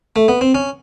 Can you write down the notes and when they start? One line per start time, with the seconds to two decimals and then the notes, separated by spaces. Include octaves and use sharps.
0.16 A3
0.28 B3
0.41 C4
0.54 C#4